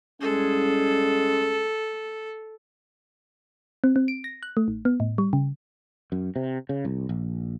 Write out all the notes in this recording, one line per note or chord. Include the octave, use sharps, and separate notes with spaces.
C2 G#3 C#4 G#4 A4
C4
C4
D7
A#6
F#6
A3
A1
B3
A2
G3
C#3
F#2
C3
C#3
C2
A#1